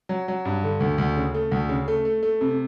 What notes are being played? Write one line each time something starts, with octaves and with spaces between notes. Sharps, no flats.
F#3
F#3
G2
D3
D2
D2
C#3
A3
D2
C#3
A3
A3
A3
C3